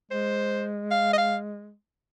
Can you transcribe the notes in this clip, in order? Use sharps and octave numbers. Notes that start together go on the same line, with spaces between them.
G#3 C5
F5
D#5
F5